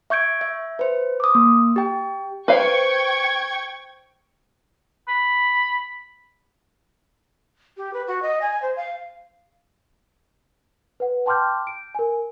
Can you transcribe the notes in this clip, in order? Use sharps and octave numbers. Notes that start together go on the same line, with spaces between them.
E5 C#6 G6 G#6 D7
E5
B4 C5
D6 D#6
A#3
G4 G5
B4 C5 F5 G5 C#6 G#6
B5
G4
B4
F#4
D#5
G#5
C5
F5
B4 F#5
G5 A5 C6 D6 F6 G6
D7
A#4 G#5